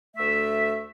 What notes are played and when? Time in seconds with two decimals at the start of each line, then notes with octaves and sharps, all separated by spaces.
0.17 D2 A3 E5